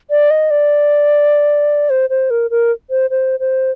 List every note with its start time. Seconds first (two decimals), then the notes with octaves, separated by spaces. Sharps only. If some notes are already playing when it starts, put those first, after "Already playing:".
0.10 D5
0.31 D#5
0.51 D5
1.90 C5
2.10 C5
2.30 A#4
2.51 A#4
2.90 C5
3.10 C5
3.40 C5